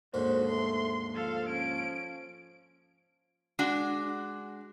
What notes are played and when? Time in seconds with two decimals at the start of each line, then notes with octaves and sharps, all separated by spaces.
0.14 D#2 G#2 D3 F#4 C5
0.47 A3 C6
1.15 F3 A4 F5
1.49 C#4 D7
3.59 G#3 D4 F#4